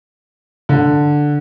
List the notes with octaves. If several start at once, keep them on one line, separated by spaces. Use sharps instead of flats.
D3